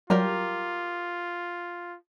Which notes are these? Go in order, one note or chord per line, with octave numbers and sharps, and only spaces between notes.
F#3 G3 F4 G4 A#4 A#5